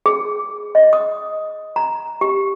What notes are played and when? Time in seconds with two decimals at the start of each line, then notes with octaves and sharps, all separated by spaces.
0.06 G#4
0.75 D#5
0.93 D#6
1.76 A#5
2.21 G4